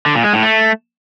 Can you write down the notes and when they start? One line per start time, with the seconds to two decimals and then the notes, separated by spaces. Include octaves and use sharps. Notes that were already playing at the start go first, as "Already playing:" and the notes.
0.06 D3
0.15 A#2
0.24 G#3
0.33 A2
0.43 A3